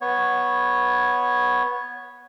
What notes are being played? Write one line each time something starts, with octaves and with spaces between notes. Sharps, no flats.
B3 C#5